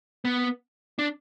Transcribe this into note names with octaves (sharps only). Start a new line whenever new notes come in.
B3
D4